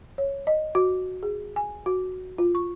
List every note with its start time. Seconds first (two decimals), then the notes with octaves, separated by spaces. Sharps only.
0.18 C#5
0.47 D#5
0.75 F#4
1.23 G#4
1.56 G#5
1.86 F#4
2.38 F4
2.55 C#6